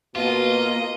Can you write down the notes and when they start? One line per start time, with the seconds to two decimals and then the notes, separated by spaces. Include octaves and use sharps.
0.16 B2 A#3 F4 D#5